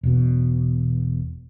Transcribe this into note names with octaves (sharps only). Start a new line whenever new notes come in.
E1 B2